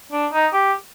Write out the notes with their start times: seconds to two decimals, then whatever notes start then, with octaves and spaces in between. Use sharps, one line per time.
0.12 D4
0.33 D#4
0.53 G4